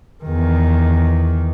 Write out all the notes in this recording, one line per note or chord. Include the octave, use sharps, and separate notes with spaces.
E2 D#3